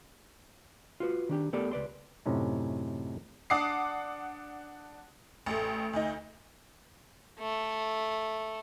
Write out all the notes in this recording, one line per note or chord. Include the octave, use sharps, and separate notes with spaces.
F4 F#4 B4
D#3 D4 G4
A3 B3 G4 A4 A#4 D5
C#2 B4 D5 C6
F#2 A2 C3 C#4 D#4
D4 F#5 D6 D#6 C7
A1 A3
D2 D#4
A3